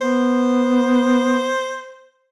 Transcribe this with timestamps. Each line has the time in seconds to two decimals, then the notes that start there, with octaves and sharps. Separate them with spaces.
0.01 B3 C5